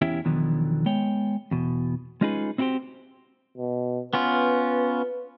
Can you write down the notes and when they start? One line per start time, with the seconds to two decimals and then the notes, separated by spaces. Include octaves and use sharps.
0.02 E2 C#4 E4 G4 E5
0.25 E2 B2 D3 D#3 F3 F#3
0.86 G#3 B3 C#5 G5
1.51 E2 B2
2.21 G#3 C#4 D#4 F4 G#4 B4
2.58 C4 E4 F#4 G4 C5
3.58 B2
4.13 B3 C#4 F4 B4